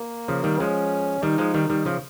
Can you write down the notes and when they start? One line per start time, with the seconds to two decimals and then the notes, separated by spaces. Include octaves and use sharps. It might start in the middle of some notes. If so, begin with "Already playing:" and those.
Already playing: A#3
0.28 C#3 F3
0.44 D#3 G3
0.60 F3 G#3 C#4
1.23 D#3 G3 D#4
1.38 F3 G#3
1.54 D#3 G3
1.70 D#3 G3
1.85 C#3 F3